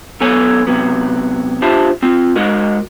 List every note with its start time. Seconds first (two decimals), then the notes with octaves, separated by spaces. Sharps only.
0.21 F#2 B3 A4 C#5 G#5
0.67 C3 F#3 B3
1.62 D4 F4 G4 C5 E5 A5
2.02 C4 F4
2.36 G#3 F#4 A#4 D#5